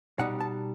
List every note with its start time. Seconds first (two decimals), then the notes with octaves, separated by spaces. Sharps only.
0.19 B2 G3 D#4 F#5
0.40 A5